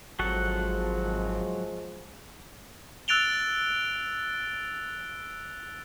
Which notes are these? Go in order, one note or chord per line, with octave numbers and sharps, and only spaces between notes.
G#1 F3 F#3 G#3 F#4 A4
E6 F#6 A6 D7 F7 G7